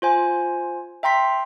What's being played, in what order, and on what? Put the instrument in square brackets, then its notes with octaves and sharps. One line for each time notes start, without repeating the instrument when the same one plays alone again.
[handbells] F4 C5 G#5
E5 G5 A#5 C6 B6